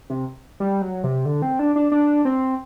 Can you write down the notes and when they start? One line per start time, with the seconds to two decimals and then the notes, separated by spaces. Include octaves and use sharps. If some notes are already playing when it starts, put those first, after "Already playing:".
0.10 C3
0.60 G3
0.82 F#3
1.04 C3
1.25 D3
1.42 C4
1.59 D4
1.76 D4
1.92 D4
2.25 C4